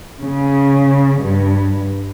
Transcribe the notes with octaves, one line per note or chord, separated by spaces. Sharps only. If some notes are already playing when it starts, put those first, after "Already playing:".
C#3
G2